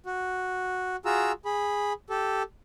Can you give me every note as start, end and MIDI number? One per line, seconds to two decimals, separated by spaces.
0.06 0.96 66
1.05 1.32 65
1.05 1.32 66
1.05 1.32 68
1.05 1.32 82
1.05 1.32 88
1.45 1.93 68
1.45 1.93 83
2.10 2.43 67
2.10 2.43 69